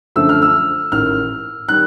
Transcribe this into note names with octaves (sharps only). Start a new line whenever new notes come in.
F#2 D3 F3 A3 E6
F6
E6
A1 G#2 D#3 F6
D#3 G3 F#6